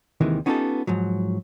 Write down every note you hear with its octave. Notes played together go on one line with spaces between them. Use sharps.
D#2 C3 D#3 E3 G#3
B3 C#4 D#4 F4 G4 A4
G#2 F3 F#3